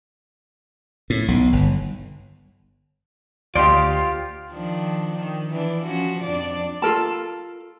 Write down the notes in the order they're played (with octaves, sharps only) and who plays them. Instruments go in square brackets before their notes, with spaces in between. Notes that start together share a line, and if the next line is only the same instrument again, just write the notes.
[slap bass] A2
B1
G1
[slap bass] D2 [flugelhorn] F4 [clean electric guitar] G4 D5 [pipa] C5 D#5 C6
[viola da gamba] D#3 F3 D4
D#3
E3 D4
F3 C#4 F#4
F2 D4 D5
[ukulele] F4 A4 A#4 A5